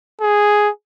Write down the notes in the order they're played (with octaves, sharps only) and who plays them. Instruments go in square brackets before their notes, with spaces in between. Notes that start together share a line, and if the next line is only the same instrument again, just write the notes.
[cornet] G#4